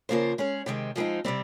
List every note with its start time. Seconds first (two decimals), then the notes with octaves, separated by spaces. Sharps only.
0.09 C#3 F3 A#3 F4 C5
0.38 G#3 C#4 G#4
0.66 C3 D#3 G#3 C4
0.96 F3 G#3 C4 D#4
1.25 C3 G3 C4